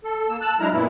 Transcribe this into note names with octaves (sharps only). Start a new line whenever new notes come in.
A4
A#3 E6
A5 E6 F#6
F#3 G#3 D4 E4 A#5 F6
F#2 A#2 B3 E4